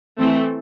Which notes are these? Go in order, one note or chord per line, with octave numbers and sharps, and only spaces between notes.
E3 A3 C4